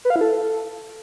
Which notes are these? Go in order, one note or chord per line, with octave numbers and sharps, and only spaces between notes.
B4
F5
E4
A4